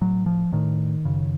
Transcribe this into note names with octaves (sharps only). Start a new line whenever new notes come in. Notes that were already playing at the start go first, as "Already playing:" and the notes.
A2 F#3
F3
A2 D#3
F#2 C#3